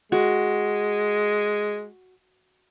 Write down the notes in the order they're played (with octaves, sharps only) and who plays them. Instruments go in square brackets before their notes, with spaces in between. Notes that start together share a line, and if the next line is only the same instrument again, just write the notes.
[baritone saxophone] G#3 [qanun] F#4